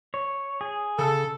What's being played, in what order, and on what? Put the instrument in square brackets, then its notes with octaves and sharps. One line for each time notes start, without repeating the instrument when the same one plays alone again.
[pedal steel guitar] C#5
G#4
[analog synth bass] C#3 [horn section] A4